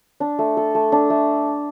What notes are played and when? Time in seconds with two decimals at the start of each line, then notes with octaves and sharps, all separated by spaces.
0.20 D4
0.39 A3
0.57 A4
0.75 A3
0.92 D4
1.10 A3